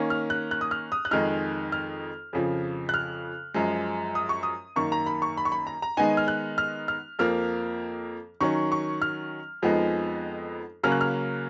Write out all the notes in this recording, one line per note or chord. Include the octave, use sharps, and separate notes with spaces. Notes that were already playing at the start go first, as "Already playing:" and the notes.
Already playing: D#3 A#3 C#4
F6
F#6
F#6
D#6
F6
D#6
F#6
F2 D#3 G#3 D#4 F6
F6
F2 C#3 F3
F#6
F6
F#2 F3 G#3
D#6
C#6
D#6
F#2 D#3 A#3 C#6
A#5
B5
C#6
B5
C#6
B5
A#5
A#5
D#3 G#3 B3 D#4 G#5
F6
F#6
F6
F6
F2 F3 A#3 F6
D#3 F#3 C#4 C#6
C#6
F6
F2 F3 G#3 B3 D#4
C#3 F#3 A#3 C#4 F6
F#6
F6